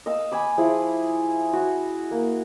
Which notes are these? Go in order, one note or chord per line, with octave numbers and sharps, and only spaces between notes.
D#5 F5 E6
G#5 B5 D6
F3 E4 G#4
F#4
A#3